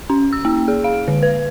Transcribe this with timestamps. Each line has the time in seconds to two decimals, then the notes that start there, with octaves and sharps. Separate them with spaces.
0.10 C#4
0.33 E6
0.45 A#3
0.68 G#4
0.84 F5
1.08 D3
1.23 B4